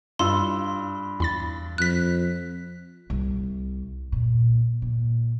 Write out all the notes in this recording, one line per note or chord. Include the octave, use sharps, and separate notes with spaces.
G2 F4 C6 E6
E2 B5 A6
F2 F#6 B6
C2
A#2
A#2